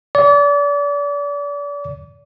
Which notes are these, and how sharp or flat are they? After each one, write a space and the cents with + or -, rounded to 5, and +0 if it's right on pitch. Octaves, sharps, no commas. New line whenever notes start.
D5 -35